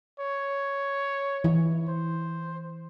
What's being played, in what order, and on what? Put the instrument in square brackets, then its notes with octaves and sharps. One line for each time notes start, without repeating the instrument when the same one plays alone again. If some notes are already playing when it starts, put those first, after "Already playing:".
[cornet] C#5
[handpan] E3
[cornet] C5